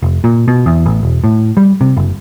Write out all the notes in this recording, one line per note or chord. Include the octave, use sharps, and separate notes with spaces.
F1
A#2
B2
E2
A1
E1
A2
G3
C3
F#1